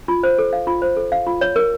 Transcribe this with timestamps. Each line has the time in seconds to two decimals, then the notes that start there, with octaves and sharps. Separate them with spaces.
0.08 F4
0.23 C5
0.39 A4
0.53 F5
0.67 F4
0.82 C5
0.96 A4
1.12 F5
1.27 F4
1.41 C#5
1.56 A#4